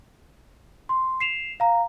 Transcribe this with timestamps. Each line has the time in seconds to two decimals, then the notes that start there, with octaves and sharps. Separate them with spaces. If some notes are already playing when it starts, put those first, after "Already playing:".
0.89 C6
1.20 C7 E7 F7
1.60 F5 A#5